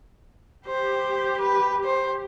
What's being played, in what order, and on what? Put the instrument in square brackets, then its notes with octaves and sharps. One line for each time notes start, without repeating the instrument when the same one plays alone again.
[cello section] G4 [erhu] C5
[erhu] B4
C5